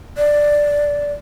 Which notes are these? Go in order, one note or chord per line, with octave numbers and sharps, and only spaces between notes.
D5